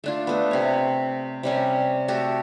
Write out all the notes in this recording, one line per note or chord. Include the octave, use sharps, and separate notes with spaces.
A3 D4 F4
A3 B3
C3 C#5
C3 G3 C#4
A3 F#4 G4 A4